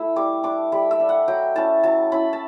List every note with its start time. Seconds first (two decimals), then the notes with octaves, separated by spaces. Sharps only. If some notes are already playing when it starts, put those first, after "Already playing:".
Already playing: A3 E4 E6
0.16 G3 D6
0.44 D4 D6
0.72 G3 B5
0.91 E5
1.00 D4
1.09 F#5
1.28 F#3 G5
1.55 C#4 E4 A5
1.83 F#3 A5
2.12 C#4 E4 B5
2.33 A5